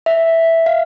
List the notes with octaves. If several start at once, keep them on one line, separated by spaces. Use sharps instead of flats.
E5
F5